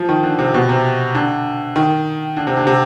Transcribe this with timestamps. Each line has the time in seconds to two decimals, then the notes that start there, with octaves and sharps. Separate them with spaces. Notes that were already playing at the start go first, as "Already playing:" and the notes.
Already playing: F3
0.09 D#3
0.23 D3
0.39 C3
0.54 B2
0.69 C3
1.15 D3
1.76 D#3
2.37 D3
2.47 C3
2.57 D3
2.67 C3